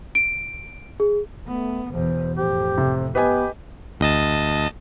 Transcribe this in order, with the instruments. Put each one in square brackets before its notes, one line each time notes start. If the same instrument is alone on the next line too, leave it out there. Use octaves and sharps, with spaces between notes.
[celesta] D7
G#4
[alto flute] A3 [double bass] B3
[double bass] E2 B2 [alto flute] C5
[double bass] F2 A2 [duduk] G4 [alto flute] C5
[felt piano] C3
[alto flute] B3 [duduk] G4 [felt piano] B4 D#5 G#5
[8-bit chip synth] D2 D#5 A5